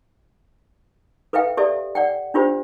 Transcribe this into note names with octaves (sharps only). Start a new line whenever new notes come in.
A4 B4 E5 F5 G5
G4 A4 D5 E5
D5 F#5 G5
D4 F4 G4 C5